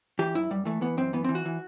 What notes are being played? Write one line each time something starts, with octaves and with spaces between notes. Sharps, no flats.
E3 G4
F#2 E4
F#2 G3
E3 A3
E3 B3
F#2 C4
E3 B3
E3 C4
F#4
E3